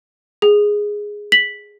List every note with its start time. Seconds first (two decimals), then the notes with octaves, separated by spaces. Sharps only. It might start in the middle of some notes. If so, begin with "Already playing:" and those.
0.42 G#4
1.32 B6 F#7